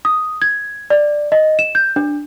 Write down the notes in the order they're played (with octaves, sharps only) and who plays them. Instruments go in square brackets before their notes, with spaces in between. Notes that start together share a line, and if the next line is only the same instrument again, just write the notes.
[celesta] D#6
G#6
D5
D#5
E7
G6
D4